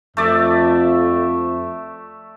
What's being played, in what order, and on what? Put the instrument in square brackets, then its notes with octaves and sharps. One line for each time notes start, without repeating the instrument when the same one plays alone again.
[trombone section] F2 [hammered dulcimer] A3 D5 E5